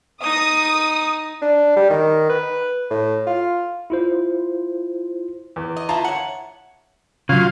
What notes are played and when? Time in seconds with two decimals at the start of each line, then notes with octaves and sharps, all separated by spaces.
0.23 D#4 D#6
1.42 D4
1.76 G3
1.90 D#3
2.29 B4
2.91 A2
3.27 F4
3.90 E4 F4 C5
5.56 E2
5.77 D#5
5.89 E4 F4 A5 A#5
6.04 C#5 F#5
7.29 C#3 F#3 F4 F5 G#6